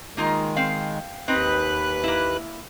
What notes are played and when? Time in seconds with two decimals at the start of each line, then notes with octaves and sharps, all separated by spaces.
0.17 D#3 G#3 A#3 D#4 F4
0.56 C4 F5
1.28 D#2 C4 D#4 B4 F#6
2.04 A#3 E4